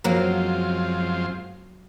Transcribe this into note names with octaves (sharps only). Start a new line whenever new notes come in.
F#2 F3 F#3 G#3 A#3 C4 F4